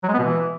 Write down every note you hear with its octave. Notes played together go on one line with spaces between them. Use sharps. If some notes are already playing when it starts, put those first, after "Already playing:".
F#3
G#3
B3
B2
E3